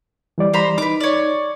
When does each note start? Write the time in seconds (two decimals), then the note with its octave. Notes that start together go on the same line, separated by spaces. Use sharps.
0.38 E3 G3 D5
0.54 C5 A#5 B5
0.78 D#4 B4 D6
1.01 C#5 D5